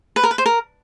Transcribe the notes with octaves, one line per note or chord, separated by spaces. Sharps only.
B4
A#4
B4
C5
A#4